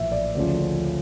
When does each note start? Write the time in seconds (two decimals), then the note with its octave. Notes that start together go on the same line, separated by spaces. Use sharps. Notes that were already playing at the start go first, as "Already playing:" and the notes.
Already playing: A#1 A2 E3 E5
0.12 D5
0.35 D2 C#3 F3